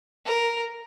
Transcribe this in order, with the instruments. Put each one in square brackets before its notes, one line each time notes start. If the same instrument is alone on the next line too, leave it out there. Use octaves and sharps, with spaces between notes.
[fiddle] A#4